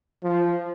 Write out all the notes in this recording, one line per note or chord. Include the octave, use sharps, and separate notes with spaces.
F3